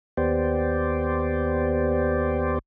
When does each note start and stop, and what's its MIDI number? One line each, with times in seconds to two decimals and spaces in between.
0.17 2.59 39
0.17 2.59 59
0.17 2.59 67
0.17 2.59 72
0.17 2.59 74